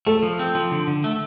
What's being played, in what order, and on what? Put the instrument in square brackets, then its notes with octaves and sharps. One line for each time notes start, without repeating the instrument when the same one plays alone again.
[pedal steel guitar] A3 [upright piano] A4
[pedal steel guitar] F3
C4
F3
D3
D3
A3